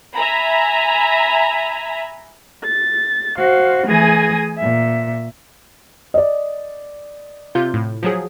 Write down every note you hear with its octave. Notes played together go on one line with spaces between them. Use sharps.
E5 G#5 A#5 B5
A6
F#4 C5 F5
E3 A3 G#4 G#5 D#6 A#6
A#2 E5
D5 D#5
C3 F4 G6
A2
F3 F#3 G#4